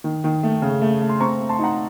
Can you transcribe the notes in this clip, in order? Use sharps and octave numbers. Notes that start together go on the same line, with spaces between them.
D#3
D#3
A3
C#3
A3
A3
C6
C4 A#5 C#6
A3
A5 C6
D#4 F#5 A#5